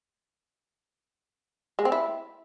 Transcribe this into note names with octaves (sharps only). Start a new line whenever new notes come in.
G#3
C4
E4